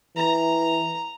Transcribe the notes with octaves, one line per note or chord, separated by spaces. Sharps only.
E3 A#5